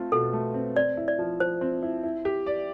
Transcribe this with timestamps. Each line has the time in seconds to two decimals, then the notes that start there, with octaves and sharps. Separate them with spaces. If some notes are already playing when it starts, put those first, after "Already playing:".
Already playing: A3 C4 F4
0.12 B2 A4
0.33 A3
0.54 C4
0.76 C4 D5
0.97 E4
1.08 D5
1.19 F3
1.40 F3 C5
1.61 C4
1.83 E4
2.03 E4
2.25 G4
2.46 D5